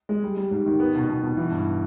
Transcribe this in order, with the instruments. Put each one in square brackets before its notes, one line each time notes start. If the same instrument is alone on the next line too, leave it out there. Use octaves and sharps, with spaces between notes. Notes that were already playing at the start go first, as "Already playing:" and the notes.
[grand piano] G#3
G3
G3
G#2
D#3
B3
B2
B2
B2
E3
G2